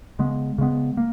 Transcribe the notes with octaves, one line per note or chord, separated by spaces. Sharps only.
C#3 G#3 B3
C#3 G#3 B3
A#3